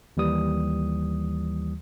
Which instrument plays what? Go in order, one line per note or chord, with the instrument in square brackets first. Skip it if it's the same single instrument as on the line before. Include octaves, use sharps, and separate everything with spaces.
[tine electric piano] D#2 E3 G3 D#6